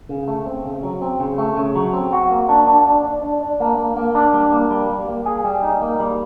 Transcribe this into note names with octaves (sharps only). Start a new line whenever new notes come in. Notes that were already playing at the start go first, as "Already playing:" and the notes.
C#3
A3
C4
C#3
F#3
C4
C#3
A3
C#3
F#3
C4
F#4
A#3
D4
D4
D4
D4
D4
D4
A#3
A#3
A#3
D4
G3
A#3
G3
G3
A#3
G#4
G3
D#4
A#3
G3